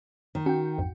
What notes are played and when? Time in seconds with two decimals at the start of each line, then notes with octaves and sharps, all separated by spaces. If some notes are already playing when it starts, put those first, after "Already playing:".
0.35 D#3
0.46 C#4 F#4 G5
0.78 A#1 F2 G#2